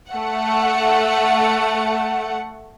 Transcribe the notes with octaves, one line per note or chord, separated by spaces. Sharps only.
A3 F#5